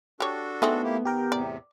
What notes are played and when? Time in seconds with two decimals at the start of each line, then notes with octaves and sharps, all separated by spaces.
0.20 D4 F#4 G4 A4 C#5
0.62 A3 B3 C4 D#4 G#4
0.83 A#3 E4 G4
1.05 D#3 G4 A#4 G5
1.32 E2 A2 C3 D5